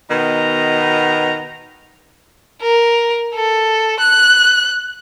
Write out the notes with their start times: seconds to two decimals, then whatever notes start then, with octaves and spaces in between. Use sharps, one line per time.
0.11 B2 D#3 B3 A#5
2.62 A#4
3.35 A4
4.00 F#6